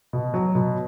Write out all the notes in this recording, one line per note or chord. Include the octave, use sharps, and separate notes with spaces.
B2
F#3
B2